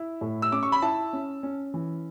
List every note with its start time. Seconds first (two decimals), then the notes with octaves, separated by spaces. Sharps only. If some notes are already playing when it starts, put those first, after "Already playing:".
Already playing: E4
0.21 A2
0.42 E6
0.52 C#4 D6
0.63 C#6
0.72 B5
0.82 E4 A5
1.13 C#4
1.43 C#4
1.74 E3